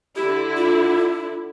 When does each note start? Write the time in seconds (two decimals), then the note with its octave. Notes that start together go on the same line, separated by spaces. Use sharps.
0.16 D3 E4 G4
0.57 F4